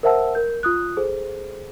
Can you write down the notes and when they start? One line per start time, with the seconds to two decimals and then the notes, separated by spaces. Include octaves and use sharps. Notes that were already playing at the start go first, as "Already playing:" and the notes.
0.03 A#4 C5 E5 F#5 A5 E6
0.35 A#4 G6
0.63 F4 D#6 F#6
0.97 G#4 A4 C5